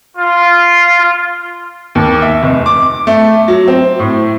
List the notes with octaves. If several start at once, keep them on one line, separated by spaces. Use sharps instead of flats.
F4
D#2
E5
F1
D6
A3
F#3
C4
A2